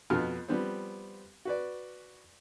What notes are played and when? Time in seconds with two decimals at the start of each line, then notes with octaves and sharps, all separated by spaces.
0.10 F2 B2 B3 F6
0.48 F3 G3 B3 C4
1.45 F#4 B4 D5